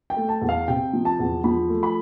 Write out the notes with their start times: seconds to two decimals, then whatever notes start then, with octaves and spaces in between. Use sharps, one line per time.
0.10 G5
0.16 A3
0.29 A5
0.41 E2
0.49 F5
0.68 C3 G5
0.93 F3
1.05 A5
1.19 E2
1.44 F3 B5
1.69 A3
1.83 B5